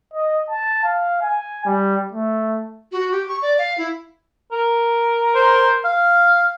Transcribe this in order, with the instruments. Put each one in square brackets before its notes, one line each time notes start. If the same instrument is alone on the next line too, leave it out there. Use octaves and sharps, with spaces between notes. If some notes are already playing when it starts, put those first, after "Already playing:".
[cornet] D#5
A5
F5
G#5
G3
A3
[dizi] F#4
G4
C#6
D5
F5
E4
[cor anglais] A#4
[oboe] C5
F5